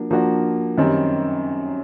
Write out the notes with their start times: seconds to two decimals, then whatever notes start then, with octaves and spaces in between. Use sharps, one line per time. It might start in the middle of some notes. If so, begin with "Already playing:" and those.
Already playing: F3 A#3 D4 F#4
0.11 F3 A#3 D4 F#4
0.78 F#2 D#3 G3 C4